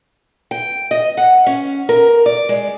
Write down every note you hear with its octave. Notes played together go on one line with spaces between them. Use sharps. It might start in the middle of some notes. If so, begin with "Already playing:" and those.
G5
D#5
F#5
C#4
A#4
D5
G#3